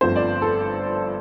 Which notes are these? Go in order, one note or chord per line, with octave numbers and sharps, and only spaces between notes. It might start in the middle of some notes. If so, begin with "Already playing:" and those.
G1 G2 F3 A3 C4 C5
D5
A4